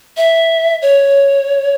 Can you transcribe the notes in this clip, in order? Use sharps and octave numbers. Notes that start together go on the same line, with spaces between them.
E5
C#5